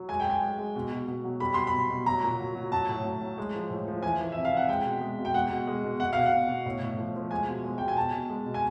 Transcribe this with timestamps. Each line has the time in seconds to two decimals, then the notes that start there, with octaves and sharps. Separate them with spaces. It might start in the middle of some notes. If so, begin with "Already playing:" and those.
Already playing: F#3
0.09 G#3 G#5
0.20 G5
0.26 G#3 G#5
0.42 G#3
0.58 G#3
0.75 B2
0.92 B2
1.07 B2
1.24 F#3
1.40 G3 B5
1.54 B2 C6
1.67 B5
1.73 B2
1.90 B2
2.06 F#3 A#5
2.23 A#2
2.39 F#3
2.55 F#3
2.72 F#3 A5
2.89 A2
3.05 F#3
3.21 F#3
3.38 G#3
3.54 F3
3.70 A2
3.87 F3
4.03 E3 G#5
4.20 E3
4.32 C3 E5
4.45 F5
4.52 C3 F#5
4.68 G#3 G5
4.85 B2
5.01 G#3
5.18 B2
5.25 G5
5.34 G#3 F#5
5.50 B2
5.67 G#3
5.84 B2
6.00 B2 F#5
6.13 B2 F5
6.26 F#5
6.33 B2
6.49 B2
6.66 A2
6.82 A2
6.98 F3
7.15 F3
7.31 G#3 G#5
7.47 B2
7.64 G#3
7.78 B2 G5
7.88 G#5
7.97 B2 A5
8.13 B2
8.29 G#3
8.46 B2
8.54 G#5